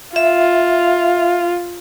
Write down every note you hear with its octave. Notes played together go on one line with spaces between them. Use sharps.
F4 E5